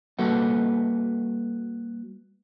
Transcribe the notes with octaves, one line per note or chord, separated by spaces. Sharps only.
G3 A#3 F#4 A4 B4 F#5